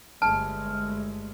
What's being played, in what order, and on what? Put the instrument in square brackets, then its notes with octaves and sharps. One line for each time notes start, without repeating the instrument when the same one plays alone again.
[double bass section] G1 G#3 A3 [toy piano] A5 [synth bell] F6